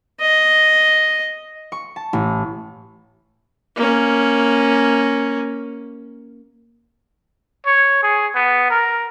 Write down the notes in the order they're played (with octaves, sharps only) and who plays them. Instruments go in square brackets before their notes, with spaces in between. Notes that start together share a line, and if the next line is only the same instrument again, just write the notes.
[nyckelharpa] D#5
[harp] C#6
A5
A1
[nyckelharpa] A#3 C#4
[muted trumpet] C#5
G#4
B3
A#4